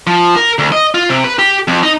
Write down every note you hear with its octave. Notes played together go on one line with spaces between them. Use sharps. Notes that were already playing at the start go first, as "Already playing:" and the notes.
F3
A#4
D2
D#5
F4
C3
B4
G4
F2
D#4